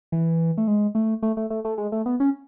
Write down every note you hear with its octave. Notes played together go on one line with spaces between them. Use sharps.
E3
A3
G#3
A3
A3
A3
A3
A3
G#3
A3
B3
C#4